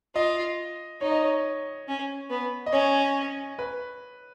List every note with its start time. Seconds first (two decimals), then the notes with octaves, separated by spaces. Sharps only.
0.15 F4 D#5
1.01 D#4 C#5
1.11 D#5
1.22 C#5
1.88 C#4
2.30 B3
2.66 D#5
2.73 C#4 C#5
3.59 B4